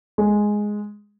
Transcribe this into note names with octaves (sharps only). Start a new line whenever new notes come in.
G#3